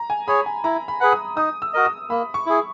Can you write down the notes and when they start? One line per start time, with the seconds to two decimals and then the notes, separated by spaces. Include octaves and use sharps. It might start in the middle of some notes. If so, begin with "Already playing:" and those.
Already playing: A#5
0.10 G#5
0.27 G#4 C#5 B5
0.46 G#5
0.64 E4 A#5
0.88 B5
1.00 G#4 B4 F#5
1.12 D#6
1.37 D#4 D#6
1.62 E6
1.74 F#4 A#4 D#5
1.85 D#6
2.10 A#3 B5
2.34 C#6
2.46 E4 G#4